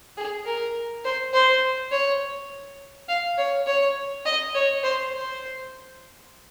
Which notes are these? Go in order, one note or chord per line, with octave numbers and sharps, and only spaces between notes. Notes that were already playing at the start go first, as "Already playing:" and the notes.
G#4
A#4
C5
C5
C#5
F5
C#5
C#5
D#5
C#5
C5
C5